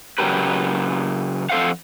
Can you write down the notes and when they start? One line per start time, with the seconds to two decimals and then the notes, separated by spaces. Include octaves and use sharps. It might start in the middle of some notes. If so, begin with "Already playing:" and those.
0.18 C#3 F#3 G4 A#4 B4
1.49 F2 A4 C5 F5 F#5